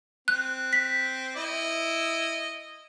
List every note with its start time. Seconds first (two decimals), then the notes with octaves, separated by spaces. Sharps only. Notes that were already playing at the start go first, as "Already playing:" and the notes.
0.28 C4 F#6
0.73 B6
1.36 E4 D#5